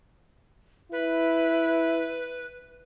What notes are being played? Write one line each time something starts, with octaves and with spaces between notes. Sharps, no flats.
E4 B4